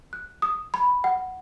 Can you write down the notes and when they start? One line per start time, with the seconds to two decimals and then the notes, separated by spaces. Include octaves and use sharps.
0.13 F#6
0.42 D#6
0.74 B5
1.04 F#5